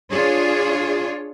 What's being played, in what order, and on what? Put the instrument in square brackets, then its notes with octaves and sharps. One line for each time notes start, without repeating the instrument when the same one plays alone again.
[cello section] D4 F4 G#4 C#5